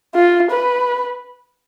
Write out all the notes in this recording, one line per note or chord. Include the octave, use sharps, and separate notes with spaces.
F4
B4